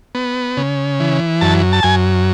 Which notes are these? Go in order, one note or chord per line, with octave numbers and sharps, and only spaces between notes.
B3
C#3
E3
F#2 A5
A5
F#2 G#5